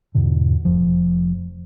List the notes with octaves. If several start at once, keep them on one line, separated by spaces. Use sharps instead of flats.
E2 G#2 B2 D3
F1 F3